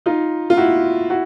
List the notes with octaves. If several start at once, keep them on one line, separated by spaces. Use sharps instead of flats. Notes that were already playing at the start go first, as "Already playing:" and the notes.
D#4 F4
F4
E4 F#4
E4 F#4